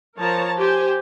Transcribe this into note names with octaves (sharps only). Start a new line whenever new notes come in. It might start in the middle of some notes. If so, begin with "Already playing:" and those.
F3 A#4 C#5 A5 A#5
G4 C5 G5 G#5